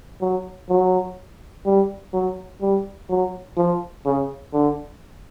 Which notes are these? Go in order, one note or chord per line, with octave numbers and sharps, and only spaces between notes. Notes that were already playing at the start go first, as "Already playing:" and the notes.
F#3
F#3
G3
F#3
G3
F#3
F3
C#3
D3